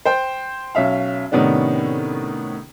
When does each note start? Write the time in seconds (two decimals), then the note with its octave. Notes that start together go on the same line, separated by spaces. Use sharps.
0.05 C5 G5
0.75 B1 C#4 E5 F5
1.31 A2 C3 D#3 B3 C#4 D4